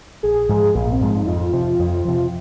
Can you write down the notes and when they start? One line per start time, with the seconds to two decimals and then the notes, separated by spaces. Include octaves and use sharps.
0.23 A#1 G#4
0.49 G#2 F3 G#3
0.75 A#1 A#3
0.92 C4
1.01 G#2 F3 G#3
1.10 D#4
1.27 F2 F4
1.53 C3 F3
1.79 F2
2.05 C3 F3